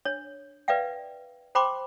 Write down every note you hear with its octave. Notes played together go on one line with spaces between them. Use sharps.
D4 C#5
B4 D5 E5 F5 G5
C5 G5 B5 C6 D6